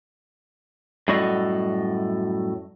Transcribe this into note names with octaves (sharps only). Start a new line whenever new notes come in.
F#2 A2 G3 F#4 A4 D#5